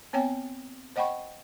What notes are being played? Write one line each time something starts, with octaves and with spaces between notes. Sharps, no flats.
B3 C4 C#5 G5 G#5
C5 D#5 F#5 G5 B5 C#6